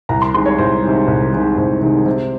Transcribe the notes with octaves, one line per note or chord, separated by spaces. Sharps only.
C2 A#5
C6
C3 D#3 G#3 C6
C#5
C2 C5
C3 D#3 G#3
C2
C3 D#3 G#3
C2 C5
C3 D#3 G#3
C3